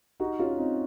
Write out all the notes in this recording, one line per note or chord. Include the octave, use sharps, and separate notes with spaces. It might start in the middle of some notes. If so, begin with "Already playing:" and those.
D#4 F#4
C#4 F4
C4 D#4